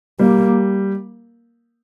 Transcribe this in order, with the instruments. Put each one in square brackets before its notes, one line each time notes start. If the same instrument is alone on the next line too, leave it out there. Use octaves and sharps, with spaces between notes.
[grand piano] G3 [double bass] A#3